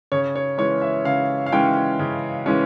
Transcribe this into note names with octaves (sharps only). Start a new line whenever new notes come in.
C#3 C#5
C#5
E3 G#3 C#4 C#5
E5
C#3 F5
F5
E3 G#3 C#4 G5
C#3
E3 G#3 C#4